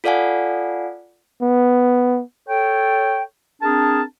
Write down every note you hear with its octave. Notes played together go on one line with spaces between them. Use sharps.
F4 A4 D5 F5 F#5 G#5
B3
A4 C#5 G5
C4 D4 G#4 A#4 A5